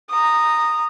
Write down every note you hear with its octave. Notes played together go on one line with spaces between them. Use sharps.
A#5 D#6